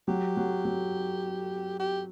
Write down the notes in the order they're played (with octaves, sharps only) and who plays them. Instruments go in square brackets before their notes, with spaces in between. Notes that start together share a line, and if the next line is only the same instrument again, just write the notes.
[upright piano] F#3 [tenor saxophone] G4
[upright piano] F#3
F#3
[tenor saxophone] G4